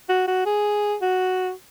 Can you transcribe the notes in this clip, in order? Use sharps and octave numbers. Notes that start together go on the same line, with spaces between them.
F#4
F#4
G#4
F#4